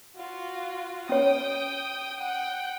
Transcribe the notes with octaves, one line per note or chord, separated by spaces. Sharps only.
F4 F#4
C#4 C#5 G5 D#6
F#5 G5